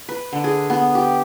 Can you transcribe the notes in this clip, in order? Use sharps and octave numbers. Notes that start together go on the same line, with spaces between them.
B4
D3
G#4
B3
G4